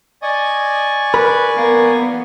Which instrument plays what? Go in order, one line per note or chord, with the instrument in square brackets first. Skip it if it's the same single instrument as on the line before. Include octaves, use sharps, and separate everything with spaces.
[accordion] D5 G#5 C#6 [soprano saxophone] D#5
[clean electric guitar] A#4 B5 [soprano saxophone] B4
[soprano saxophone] A#3 [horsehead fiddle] B3